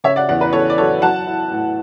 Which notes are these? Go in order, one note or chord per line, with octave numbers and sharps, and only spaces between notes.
C#3 C#5 E5
D5 F#5
E2 D5 F#5
B4
E2 A4 C#5
D5
F#3 A4 C#5
F#3 F#5 A5
E4
A2